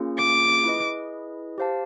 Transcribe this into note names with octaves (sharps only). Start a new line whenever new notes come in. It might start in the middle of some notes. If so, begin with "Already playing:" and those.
Already playing: A#3 C#4 F4 G#4
D6
E4 G#4 B4 D#5
G4 C5 F5 A5